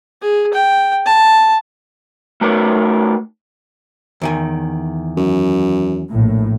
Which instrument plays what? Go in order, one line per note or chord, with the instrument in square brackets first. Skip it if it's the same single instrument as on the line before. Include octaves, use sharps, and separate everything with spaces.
[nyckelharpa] G#4
G5
A5
[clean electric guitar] A3 D#4 F#4 A#4 B4 C#5
[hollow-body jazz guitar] E2 D#3 G#5
[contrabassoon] F#2
[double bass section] A#1 A2